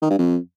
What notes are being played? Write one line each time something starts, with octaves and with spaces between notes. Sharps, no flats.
D#3
G2
F2